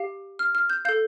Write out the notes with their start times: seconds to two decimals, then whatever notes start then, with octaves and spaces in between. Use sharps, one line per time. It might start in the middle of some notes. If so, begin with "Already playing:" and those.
Already playing: G4 F5
0.39 F6
0.55 F6
0.70 G6
0.85 F5 G6
0.89 A4